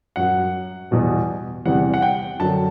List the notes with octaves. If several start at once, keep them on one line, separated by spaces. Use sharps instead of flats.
F#2 F#3 F#5
E2 B2 G3
E2 C3 E3 G3 F#5
F#5
G5
F#2 D3 F#3 A5